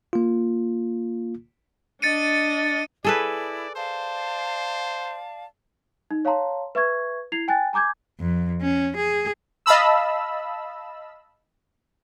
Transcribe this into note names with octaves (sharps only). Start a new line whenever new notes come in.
A#3 F4
D4 D#5 A6 C#7 D#7
E4 G#4 A4 B4 D5
C5 D5 F5 A5
D#4
C#5 F5 A5 A#5 C6
B4 E5 C#6 G#6
E4 G#6 C7 F7
G5 G#5 F#6 A6
G#5 A#5 D6 G6 G#6
F2
C#4
G#4
D#5 F5 A5 B5 E6